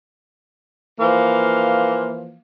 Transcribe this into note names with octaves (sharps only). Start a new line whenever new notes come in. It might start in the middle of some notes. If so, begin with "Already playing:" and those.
E3 F3 A#3 F5